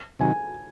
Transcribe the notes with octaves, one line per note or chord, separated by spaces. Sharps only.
C3 D#3 F#3 G#5